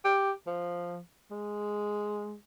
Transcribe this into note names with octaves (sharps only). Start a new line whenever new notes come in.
G4
F3
G#3